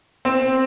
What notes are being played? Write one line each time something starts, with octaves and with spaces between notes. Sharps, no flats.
C4